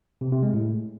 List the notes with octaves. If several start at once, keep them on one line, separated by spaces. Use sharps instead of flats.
C3
C3
G#3
A2